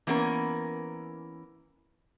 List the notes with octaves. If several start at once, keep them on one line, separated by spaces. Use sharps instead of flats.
E3 A#3 B3 C#4 A#4